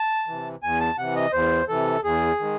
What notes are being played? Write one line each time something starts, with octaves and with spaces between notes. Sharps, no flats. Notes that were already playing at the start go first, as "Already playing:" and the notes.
Already playing: A5
C3 E3
E2 G#5
A5
C3 E3 F#5
D#5
E2 C5
C3 E3 A4
E2 G#4
D#3 G#3